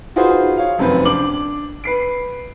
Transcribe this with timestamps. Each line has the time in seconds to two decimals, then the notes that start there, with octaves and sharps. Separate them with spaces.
0.16 D#4 F4 F#4 G#4 B4 C5
0.57 C#5 F5
0.78 F1 F#2 D#3 C4 B4
1.05 D4 D6 F#7
1.84 B4 C7 D7